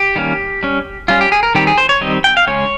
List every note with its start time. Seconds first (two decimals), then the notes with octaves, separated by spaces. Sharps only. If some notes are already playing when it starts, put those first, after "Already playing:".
Already playing: G4
0.16 D#3 G3 A#3 C#4
0.63 G3 C#4
1.08 G3 C#4 F4
1.21 G4
1.32 G#4
1.43 A#4
1.55 D#3 G3 C4 G4
1.67 G#4
1.78 C5
1.89 C#5
2.01 D#3 G3 C4 D#5
2.24 G5
2.37 F5
2.47 C#3 G#3 C#4 C#5